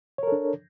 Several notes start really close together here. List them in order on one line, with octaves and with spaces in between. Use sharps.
C#5 A#4 A4 D4